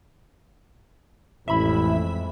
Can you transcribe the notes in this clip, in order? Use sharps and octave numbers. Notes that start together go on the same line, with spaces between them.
A1 F2 G#3 E4 E5 B5